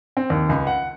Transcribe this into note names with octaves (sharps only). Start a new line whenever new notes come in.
C4
D#2
C#2
F#5